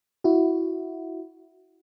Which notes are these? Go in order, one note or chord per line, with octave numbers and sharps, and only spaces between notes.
E4 F#4